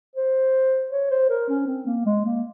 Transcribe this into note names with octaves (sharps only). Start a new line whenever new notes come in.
C5
C#5
C5
A#4
C#4
C4
A#3
G#3
A#3